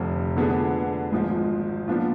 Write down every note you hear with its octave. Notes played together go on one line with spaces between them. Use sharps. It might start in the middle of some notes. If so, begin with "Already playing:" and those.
Already playing: F1 F2 D3
D3 F3 B3 D4 G#4
G#1 G#2 F3 G#3
A#2 F3 B3 D4 F4